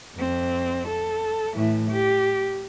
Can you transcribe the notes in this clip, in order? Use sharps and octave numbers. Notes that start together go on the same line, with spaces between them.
F2 C4
A4
A2 E3
G4